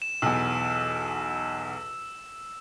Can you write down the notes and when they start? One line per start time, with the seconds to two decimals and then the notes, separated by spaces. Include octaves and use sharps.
0.02 E7
0.22 B1 E2 E6